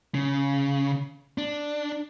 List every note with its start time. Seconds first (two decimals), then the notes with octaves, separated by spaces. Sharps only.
0.15 C#3
1.38 D4